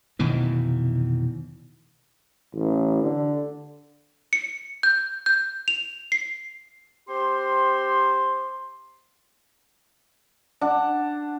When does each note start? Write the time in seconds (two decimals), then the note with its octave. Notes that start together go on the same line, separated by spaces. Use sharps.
0.19 F1 B2 D#3 E3
2.54 A1
3.02 D3
4.33 C#7
4.83 G6
5.26 G6
5.68 F7
6.12 C7
7.08 C4 G4 C5 C6
10.61 D4 F#5